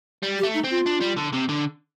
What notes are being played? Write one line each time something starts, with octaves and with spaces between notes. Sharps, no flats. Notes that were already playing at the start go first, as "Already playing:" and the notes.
G3
G4
A3
D#4
C4
F4
D4
G3
D3
C3
D3